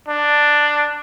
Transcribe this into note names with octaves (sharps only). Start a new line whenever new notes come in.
D4